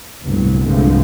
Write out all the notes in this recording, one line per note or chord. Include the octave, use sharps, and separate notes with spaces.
G1 C2 A2 F#3
C2 G2 D3 F3 G#3 A3